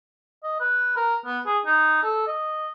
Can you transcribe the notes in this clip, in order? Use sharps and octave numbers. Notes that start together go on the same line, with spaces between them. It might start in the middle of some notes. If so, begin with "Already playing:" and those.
D#5
B4
A#4
B3
G#4
D#4
A4
D#5